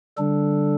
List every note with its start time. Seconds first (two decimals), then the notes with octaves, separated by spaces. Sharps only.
0.17 D3 G3 D4 A4